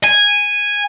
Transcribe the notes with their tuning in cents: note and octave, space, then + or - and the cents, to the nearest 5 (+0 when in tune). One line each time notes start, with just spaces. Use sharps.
G#5 -10